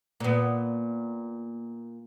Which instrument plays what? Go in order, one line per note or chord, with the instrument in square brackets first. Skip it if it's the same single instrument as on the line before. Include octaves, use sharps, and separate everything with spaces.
[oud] A#2 B3